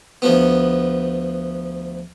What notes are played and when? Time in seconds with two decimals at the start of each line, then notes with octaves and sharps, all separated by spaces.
0.22 D2 F3 B3